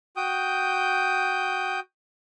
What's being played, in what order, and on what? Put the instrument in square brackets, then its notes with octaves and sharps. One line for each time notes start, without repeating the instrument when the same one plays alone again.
[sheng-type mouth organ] F#4 G5 D#6 G6